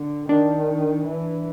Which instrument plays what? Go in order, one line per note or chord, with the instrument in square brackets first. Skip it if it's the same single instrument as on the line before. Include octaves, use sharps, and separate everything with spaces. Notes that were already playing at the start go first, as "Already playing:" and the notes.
Already playing: [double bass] D3
[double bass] D#3 [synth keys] D4
[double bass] E3